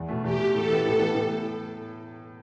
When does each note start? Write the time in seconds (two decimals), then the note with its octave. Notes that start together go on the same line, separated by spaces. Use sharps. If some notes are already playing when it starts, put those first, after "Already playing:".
Already playing: E2
0.09 B2 A3
0.23 E2 G4
0.39 B2 A3
0.54 A2 A4
0.69 E3 B3 G4
0.84 A2 A4
0.99 E3 B3 G4
1.14 A2